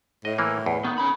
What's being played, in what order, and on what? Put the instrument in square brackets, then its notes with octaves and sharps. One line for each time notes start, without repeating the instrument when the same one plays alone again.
[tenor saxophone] A2 [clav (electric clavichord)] D#5
[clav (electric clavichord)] E3 A#3
E2
[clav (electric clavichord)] D#3 [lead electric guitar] B3
[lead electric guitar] C#4 B5